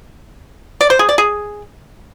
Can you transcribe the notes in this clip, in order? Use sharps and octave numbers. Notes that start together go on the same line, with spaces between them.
D5
C5
G#4
D5
G#4